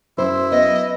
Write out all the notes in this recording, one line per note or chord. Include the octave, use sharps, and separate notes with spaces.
F#2 E4 C5
B3 D#5